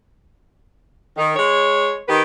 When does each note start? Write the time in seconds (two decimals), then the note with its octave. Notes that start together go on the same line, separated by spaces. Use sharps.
1.17 D#3
1.36 G#3 C#5
2.08 D#3 G4 B4